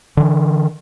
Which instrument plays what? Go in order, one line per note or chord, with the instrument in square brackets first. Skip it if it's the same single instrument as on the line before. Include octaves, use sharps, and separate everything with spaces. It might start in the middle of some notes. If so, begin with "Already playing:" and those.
[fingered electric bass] D3 E3